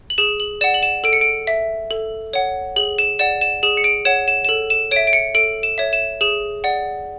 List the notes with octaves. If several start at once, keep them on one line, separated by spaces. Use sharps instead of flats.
F#7
G#4 E7
F#7
D5 F#5 E7
F#7
E7
A4 D7
C#7
D7
E5
A4
C#5 F#5
G#4 F#7
E7
D5 F#5 E7
E7
G#4 E7
C#7
D7
C#5 F#5 E7
E7
E7
A4 F#7
E7
C#5 E5 D7
D7
C#7
A4 D7
E7
C#5 E5
E7
G#4 E7
D5 F#5